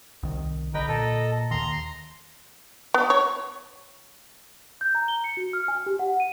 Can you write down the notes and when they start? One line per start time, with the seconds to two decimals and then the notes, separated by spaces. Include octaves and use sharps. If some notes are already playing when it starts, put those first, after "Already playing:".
0.23 C2 D#3
0.74 B1 D3 B4 D#5 G5 A#5
0.88 A#2 A4
1.51 D#2 D#3 A#5 C6
2.94 B3
3.10 C#5
4.81 G6
4.95 A#5
5.08 G7
5.24 C#7
5.37 F#4
5.53 F6
5.68 G#5
5.86 G4
5.99 F#5
6.20 D#7